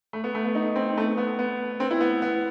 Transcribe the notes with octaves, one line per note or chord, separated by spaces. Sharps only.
A3
B3
A3
B3
D#4
C4
A3
B3
B3
C4
E4
B3
B3